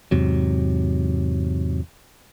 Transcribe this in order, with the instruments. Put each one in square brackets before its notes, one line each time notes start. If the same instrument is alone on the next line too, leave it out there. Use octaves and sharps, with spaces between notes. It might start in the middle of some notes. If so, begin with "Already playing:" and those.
[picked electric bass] E2 G#2 C3 F#3